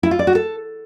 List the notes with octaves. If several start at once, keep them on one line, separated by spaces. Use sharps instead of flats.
E4
F4
D5
F#4
A4